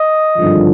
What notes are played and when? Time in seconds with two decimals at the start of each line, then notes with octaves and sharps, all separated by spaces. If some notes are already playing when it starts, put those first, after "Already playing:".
Already playing: D#5
0.38 G#1 G2 D3 F3